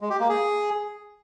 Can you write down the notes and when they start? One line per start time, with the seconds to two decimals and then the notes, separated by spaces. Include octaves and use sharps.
0.01 G#3
0.10 G4
0.20 A#3
0.29 G#4